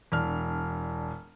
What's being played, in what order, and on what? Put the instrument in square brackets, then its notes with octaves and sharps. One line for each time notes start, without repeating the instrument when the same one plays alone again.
[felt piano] E1 D4 F6